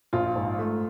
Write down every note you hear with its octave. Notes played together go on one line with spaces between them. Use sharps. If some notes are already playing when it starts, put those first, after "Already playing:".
A#1 F4
G#2
A3